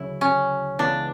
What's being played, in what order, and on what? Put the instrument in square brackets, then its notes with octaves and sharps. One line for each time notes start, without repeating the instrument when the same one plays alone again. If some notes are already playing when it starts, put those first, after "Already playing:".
Already playing: [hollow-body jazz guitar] D2 C#3 F#3 [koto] E4
[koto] C#4
[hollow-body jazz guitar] C#2 C#3 E3 B3 [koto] D4